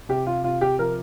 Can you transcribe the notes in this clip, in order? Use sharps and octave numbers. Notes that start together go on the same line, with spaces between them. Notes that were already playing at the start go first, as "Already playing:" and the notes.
C3 G4
F4
C3 F4
G4
F3 A#4